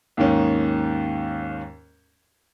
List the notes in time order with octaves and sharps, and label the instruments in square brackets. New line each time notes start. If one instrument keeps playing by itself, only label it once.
[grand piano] D#2 G#2 D#3 C#4